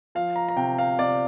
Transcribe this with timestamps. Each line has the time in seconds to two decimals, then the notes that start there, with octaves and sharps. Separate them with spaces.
0.15 F3 F5
0.36 A#5
0.49 A#5
0.57 C3 G5
0.78 F5
0.99 C3 D5